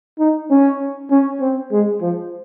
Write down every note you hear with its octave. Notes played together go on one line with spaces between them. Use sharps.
D#4
C#4
C#4
C4
G#3
F3